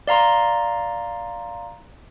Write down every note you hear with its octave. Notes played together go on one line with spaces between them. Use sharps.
D5 F5 A#5 C6